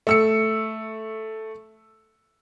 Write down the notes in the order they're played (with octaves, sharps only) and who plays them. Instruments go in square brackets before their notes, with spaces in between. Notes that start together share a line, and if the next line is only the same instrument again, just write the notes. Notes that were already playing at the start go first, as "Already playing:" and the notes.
[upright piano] A3 E6 C#7